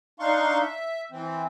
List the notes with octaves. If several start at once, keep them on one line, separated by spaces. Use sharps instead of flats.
D4 D#4 F5 C6 C#6
E5
E3 C4